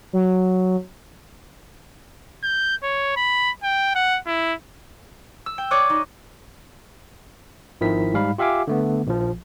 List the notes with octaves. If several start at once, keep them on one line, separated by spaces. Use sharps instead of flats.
F#3
G6
C#5
B5
G5
F#5
E4
E6
G5
C#5 D5 D6 D#6 F#6
D#4
G#1 D#3 F3 E4 B6
G#2 G3 F5 B5
F4 G4 E5 F5 G#5 D6
D3 A3 B3
A#1 F3